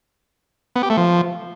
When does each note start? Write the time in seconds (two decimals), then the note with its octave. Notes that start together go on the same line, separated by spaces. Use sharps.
0.76 B3
0.83 G4
0.90 A3
0.97 F3